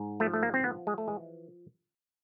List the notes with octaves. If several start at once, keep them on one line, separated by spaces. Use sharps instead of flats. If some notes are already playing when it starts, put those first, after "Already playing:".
Already playing: G#2
F3 A3
A3
A#3
C4
F3 B3
G#3
A3
E3 G#3